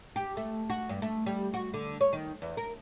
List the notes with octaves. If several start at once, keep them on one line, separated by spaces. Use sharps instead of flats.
G4
A3
F#4
G2
A3
G3
F#4
D3
C#5
D#3
E2
A#4